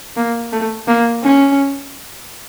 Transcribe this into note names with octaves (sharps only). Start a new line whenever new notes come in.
A#3
A3
A#3
C#4